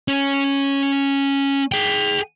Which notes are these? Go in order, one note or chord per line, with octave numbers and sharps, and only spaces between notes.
C#4
G#4 G5